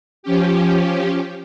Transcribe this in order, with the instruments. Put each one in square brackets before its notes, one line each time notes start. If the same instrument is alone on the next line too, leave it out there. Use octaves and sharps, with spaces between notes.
[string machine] F3 C#4 G4